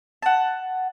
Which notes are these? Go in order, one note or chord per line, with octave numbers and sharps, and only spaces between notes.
F#5 A5